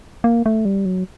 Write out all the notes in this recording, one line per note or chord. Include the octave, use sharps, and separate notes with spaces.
A#3
A3
G3
F#3